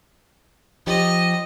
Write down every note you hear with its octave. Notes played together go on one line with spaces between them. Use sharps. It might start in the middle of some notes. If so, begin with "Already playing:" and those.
F3 D#4 G4 D#5